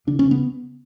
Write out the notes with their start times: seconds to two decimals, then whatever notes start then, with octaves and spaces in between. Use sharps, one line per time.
0.07 C#3 D4
0.19 C#4
0.25 C#3
0.31 B3